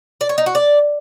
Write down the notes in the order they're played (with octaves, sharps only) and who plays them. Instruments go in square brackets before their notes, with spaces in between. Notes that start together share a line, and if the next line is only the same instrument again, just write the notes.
[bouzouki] D5
C#5
D#4
F#4
D5